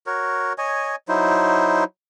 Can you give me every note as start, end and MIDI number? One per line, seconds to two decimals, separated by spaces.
0.06 0.53 66
0.06 0.53 70
0.06 0.53 73
0.58 0.96 73
0.58 0.96 75
0.58 0.96 80
1.08 1.84 54
1.08 1.84 63
1.08 1.84 64
1.08 1.84 72